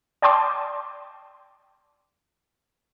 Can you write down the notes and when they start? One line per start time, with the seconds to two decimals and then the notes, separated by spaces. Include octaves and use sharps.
0.22 D5 G5 A5 C6 D6